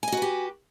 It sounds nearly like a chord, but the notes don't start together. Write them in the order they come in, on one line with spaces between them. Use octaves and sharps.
G#5 D#5 F#4 B4 G4